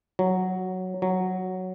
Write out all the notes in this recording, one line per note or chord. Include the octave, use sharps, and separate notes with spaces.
F#3
F#3